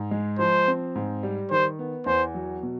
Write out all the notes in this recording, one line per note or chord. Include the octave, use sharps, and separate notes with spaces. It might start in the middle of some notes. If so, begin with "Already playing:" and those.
Already playing: G#2
G#3
F3 C5
C4
G#2
G3
D#3 C5
B3
E2 C5
F#3
B2